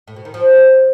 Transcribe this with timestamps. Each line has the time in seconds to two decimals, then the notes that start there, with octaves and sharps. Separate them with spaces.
0.08 A2
0.16 B2
0.25 D#3
0.34 F3